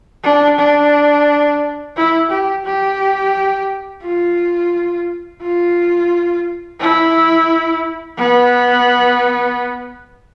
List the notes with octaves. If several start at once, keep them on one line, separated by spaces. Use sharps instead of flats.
D4
D4
E4
G4
G4
F4
F4
E4
B3